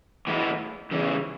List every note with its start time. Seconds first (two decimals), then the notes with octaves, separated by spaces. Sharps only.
0.27 A2 E3 G#3 B3 E4
0.91 E2 C#3 E3